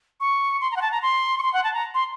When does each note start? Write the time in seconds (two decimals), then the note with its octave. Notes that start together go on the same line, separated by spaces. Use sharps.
0.20 C#6
0.61 C6
0.72 A#5
0.76 F#5
0.82 A5
0.92 A#5
1.02 C6
1.38 C#6
1.43 C6
1.54 F#5
1.64 A5
1.74 A#5
1.94 C6